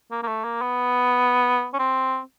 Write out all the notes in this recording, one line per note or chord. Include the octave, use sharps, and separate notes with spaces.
A#3
A#3
A3
A#3
B3
C#4
C4